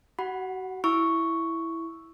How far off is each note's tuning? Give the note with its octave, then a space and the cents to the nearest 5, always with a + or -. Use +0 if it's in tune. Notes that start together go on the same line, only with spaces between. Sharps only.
F#4 +30 F#5 +0 B5 +0
E4 +0 C#6 +0 E6 +0